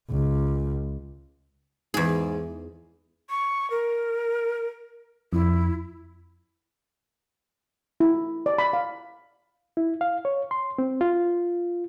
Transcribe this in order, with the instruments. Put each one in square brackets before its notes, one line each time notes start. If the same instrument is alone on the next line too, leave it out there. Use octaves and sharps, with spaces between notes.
[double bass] C#2
[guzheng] E2 G#4 [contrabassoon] G#2
[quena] C#6
A#4
[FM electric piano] F2 [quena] E4
[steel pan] E4
D5
B5
F5
[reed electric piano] E4
F5
C#5
C6
C4
F4